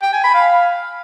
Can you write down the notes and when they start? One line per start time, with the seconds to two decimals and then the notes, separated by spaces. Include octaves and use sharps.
0.02 G5
0.13 G#5
0.24 B5
0.35 F5